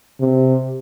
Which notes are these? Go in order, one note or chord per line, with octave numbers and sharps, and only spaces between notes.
C3